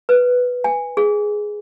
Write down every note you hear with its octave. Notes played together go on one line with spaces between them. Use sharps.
B4
G#5
G#4